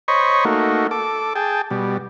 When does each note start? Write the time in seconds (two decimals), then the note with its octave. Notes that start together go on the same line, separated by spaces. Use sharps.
0.08 C5 C#5 D#5 B5 C#6
0.45 A3 A#3 D#4 F#4
0.91 A4 D6
1.36 G#4 G5 A5
1.71 B2 G3